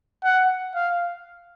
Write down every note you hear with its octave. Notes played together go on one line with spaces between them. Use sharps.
F#5
F5